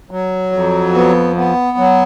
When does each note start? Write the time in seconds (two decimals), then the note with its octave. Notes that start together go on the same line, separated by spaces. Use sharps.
0.11 F#3
0.52 F2
0.94 B3
1.36 B3
1.78 F#3